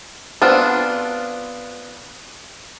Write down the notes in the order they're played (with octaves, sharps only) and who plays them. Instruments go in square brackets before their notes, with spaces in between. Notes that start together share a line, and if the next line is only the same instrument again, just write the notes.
[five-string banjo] B3 C4 D4 F4